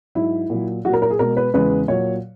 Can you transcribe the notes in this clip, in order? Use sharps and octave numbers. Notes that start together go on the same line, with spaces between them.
G#2 F#3 E4
A#2 F#3
A#2 F#3 F#4 A#4
A#4
G#4
B2 G#3 A#4
B4
E2 C#3 G#3 B4
A#2 F#3 C#5